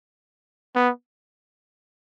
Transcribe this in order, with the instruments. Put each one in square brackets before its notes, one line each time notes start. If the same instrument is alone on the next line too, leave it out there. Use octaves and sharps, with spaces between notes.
[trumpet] B3